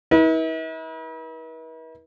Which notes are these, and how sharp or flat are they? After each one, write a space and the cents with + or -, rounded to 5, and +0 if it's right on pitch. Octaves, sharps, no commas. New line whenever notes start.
E4 -45 B4 -40